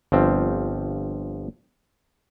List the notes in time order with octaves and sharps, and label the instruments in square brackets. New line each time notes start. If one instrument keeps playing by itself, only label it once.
[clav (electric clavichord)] G1 F3 C4